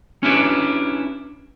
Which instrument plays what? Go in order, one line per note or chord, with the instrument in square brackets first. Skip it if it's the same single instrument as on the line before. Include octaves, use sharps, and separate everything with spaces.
[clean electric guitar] C#4 D4 E4 F#4 G4 B4